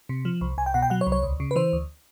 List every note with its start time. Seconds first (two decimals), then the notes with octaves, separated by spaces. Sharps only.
0.09 C3
0.25 F3
0.41 C2
0.58 C2 G#5
0.66 G5
0.74 B2 F#5
0.82 G5
0.90 F#3 F#5
1.01 C#5
1.07 C2
1.12 C#5
1.23 D2
1.40 C#3
1.51 B4
1.56 E3 C5
1.73 D2